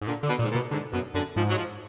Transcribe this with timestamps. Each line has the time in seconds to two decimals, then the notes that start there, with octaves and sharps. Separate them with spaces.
0.01 G#2
0.07 A#2 D3
0.23 D3
0.28 B2
0.39 A#2
0.43 G#2
0.50 A#2
0.55 B2
0.71 G#2 D3
0.92 F#2 B2
1.14 F#2 D3
1.35 G#2 F3
1.48 F#3
1.57 F3